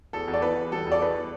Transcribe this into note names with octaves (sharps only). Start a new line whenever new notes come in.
E2 A4
E2
D5
E2 B4
E3
G3 A4
E2
D5
E2 B4